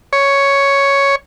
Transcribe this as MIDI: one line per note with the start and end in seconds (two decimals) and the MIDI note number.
0.13 1.15 73